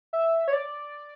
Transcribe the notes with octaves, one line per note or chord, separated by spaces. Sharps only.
E5
C#5
D5